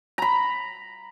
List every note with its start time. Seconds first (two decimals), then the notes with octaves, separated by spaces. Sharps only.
0.18 A#5 B5